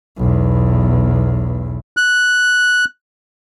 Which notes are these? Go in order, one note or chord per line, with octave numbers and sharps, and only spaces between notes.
B1 E2
F#6